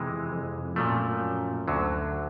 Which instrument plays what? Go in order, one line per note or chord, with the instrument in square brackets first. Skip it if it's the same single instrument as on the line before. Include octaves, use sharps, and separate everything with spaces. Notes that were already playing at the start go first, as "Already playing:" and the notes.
Already playing: [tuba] F2 [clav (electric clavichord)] C3 E3 G#3
[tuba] F2
[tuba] F#2 [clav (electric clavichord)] A#2 F3 A3
[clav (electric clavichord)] D2 D3 F#3